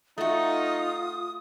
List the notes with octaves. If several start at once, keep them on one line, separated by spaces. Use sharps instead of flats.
A3 D#4 F4 F#4 D#6